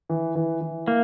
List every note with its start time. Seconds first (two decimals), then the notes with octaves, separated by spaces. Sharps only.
0.09 E3
0.35 E3
0.61 E3
0.87 A#3 E4